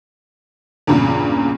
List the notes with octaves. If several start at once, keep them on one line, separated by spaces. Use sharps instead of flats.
E2 G2 A#2 C#3